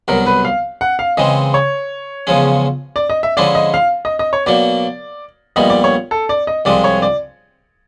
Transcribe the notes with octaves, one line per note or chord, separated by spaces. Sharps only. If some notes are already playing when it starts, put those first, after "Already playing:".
C2 B2 F#3 A#4
B4
F5
F#5
F5
C#3 E3 G#3 C4 D#5
C#5
E2 C#3 F3 G#3 C#4
D5
D#5
E5
D3 F3 G#3 C#4 E4 D5
D#5
F5
D#5
D#5
C#5
B2 F#3 A#3 D5
A#1 A#2 G3 B3 D#5
D5
C#5
A4
D5
D#5
C2 C3 F3 G#3 D5
C#5
D5